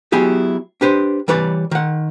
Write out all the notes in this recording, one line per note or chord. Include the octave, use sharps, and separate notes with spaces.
F#3 B3 E4 G4 G#4
D4 G4 B4 C5
E3 G3 B4 C#5 D5
D#3 F#5